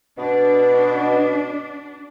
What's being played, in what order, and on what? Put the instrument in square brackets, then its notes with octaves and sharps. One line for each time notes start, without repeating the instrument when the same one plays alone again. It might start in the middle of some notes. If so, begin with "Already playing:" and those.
[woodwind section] B2 [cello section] D4